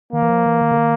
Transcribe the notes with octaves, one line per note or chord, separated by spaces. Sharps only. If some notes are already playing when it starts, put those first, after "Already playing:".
D#3 A#3
E3
F3
E3
D#3
D3
D#3